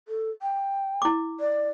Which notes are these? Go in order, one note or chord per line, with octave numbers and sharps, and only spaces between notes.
A4
G5
E4 D6
D5